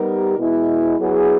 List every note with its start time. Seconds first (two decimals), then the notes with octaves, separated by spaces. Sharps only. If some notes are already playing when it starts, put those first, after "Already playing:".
Already playing: G3 B3 D#4 G4 A#4
0.38 B2 G#3 B3 E4
0.98 F#3 B3 E4 G#4